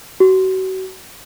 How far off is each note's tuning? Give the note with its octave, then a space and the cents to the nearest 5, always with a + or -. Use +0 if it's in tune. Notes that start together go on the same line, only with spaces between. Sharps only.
F#4 +30